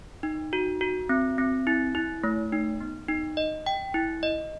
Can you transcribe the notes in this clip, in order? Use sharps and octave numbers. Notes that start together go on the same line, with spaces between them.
D#4
F#4
F#4
C4
C4
E4
E4
A3
D#4
B3
D#4
D#5
G5
E4
D#5